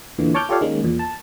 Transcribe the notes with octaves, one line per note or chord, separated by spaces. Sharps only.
E2 A#2 D3 E3
C#5 A5 C#6 D6 F6 G6
F4 G4 A4 C#5 D5 F5
D#3 G#3 A#3 C#4
E2 A#2
A5